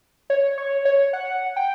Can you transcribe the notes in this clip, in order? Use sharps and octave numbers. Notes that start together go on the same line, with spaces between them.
C#5
C#5
C#5
F#5
G5